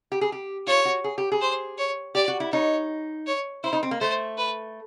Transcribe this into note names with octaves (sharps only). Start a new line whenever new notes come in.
G4
G#4
G4
F4 C#5
F#4
G#4
G4
G#4
C5
C#5
G4 D5
F#4
E4
D#4 C#5
C#5
E4 C5
D#4
C4
A#3
A3 C5
B4